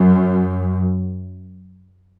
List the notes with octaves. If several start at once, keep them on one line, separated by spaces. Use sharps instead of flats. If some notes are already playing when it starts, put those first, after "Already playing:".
Already playing: F#2